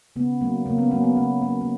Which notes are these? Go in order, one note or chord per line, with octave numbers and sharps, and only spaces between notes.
C#3 B3
F#3 A#3
C#3 A#3
B3
F#3 A#3 C#4
B3
C#3 A#3
F#3 A#3
A#3